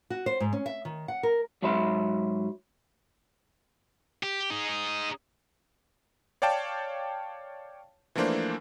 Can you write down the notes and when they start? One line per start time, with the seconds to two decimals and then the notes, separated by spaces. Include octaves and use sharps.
0.10 F#4
0.26 C5
0.40 G#2
0.53 C#4
0.66 E5
0.85 D#3
1.08 F#5
1.23 A#4
1.62 G#2 F#3 E5 B5 C6
4.23 G4
4.50 D#4 G#4
6.42 C#5 D5 F5 G5 A5
8.15 E3 F3 A3 A#3 D4 C5